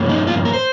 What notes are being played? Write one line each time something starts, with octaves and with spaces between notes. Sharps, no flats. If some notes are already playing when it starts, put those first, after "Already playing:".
Already playing: G2 F3 A#3 C#4
D#4
F4
A#4
C5